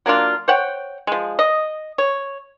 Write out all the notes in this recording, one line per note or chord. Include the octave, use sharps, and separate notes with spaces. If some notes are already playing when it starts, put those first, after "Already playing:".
F#3 A#3 D4 F4
C5 C#5 F#5 G5
F3 G#3
D#5
C#5